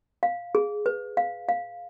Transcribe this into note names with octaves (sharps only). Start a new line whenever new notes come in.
F5
G#4
B4
F5
F5